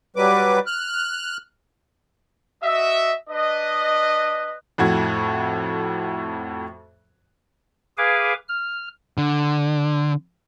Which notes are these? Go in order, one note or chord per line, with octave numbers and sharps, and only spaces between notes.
F#3 G3 B4 D6
F6 F#6
F#4 D#5 E5
D4 B4 D#5
F2 A2 F#4 G#6
G#4 B4 F5 G#5 D6
F6
D3